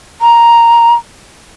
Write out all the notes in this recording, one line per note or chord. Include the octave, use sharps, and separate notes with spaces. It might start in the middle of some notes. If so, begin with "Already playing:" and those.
A#5